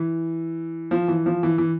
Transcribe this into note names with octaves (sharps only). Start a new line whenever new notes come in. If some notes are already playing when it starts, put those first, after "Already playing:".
Already playing: E3
F3
E3
F3
E3
E3